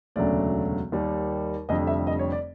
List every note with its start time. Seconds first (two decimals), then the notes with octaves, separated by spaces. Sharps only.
0.16 E1 D2 C#3 F#3 A3 D5
0.92 D#2 D#3 G3
1.69 F1 F2 D3 G3 D#5
1.87 E5
2.07 D#5
2.19 C#5
2.32 D5